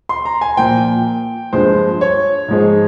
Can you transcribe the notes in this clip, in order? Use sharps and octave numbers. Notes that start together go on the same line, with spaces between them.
C6
A#5
G#5
A#2 F3 A#3 G5
G2 F3 G#3 C5
C#5
G#2 F3 G#3